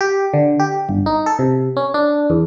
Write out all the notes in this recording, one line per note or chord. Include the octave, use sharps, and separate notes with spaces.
G4
D3
G4
G1
D#4
A4
C3
C#4
D4
E2